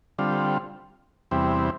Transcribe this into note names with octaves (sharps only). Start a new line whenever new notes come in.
D3 G3 C4 F4
E2 C3 G3 C4 E4